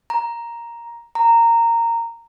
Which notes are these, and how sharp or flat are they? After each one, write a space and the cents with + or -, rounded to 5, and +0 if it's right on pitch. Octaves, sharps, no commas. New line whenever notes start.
A#5 +5
A#5 -15